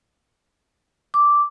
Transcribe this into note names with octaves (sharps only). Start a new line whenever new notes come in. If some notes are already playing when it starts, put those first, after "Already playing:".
D6